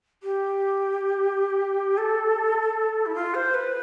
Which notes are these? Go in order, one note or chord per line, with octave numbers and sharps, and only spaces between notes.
G4
A4
E4
F4
C5
B4